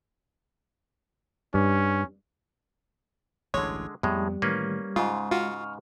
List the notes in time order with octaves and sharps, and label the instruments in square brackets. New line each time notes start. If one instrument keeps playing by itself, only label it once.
[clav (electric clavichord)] G2 [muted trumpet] C#4
[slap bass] A1 D2 G2 [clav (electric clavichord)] D3 G#3 [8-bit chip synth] C#5
[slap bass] F2 B3 [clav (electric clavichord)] A2 G#3 [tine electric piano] G3 G4
[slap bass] A2 D#3 E3 [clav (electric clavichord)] A#3 C#4 B4
[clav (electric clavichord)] G#2 C#3 [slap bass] G#3 [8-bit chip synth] F4
[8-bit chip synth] F4 F#4 [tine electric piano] C#6 F6